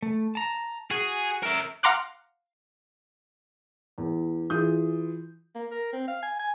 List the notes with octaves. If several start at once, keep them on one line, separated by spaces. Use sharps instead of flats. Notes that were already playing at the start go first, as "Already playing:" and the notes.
A3
A5 A#5
F#4 G#4
A#4 E5
F5 F#5 A#5 C6 D6 F#6
E2
E3 F4 G#4 D#6 G6
A#3
A#4
C4
F5
G#5
G#5